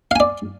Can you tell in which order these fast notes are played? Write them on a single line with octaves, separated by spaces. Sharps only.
F5 G#5 D5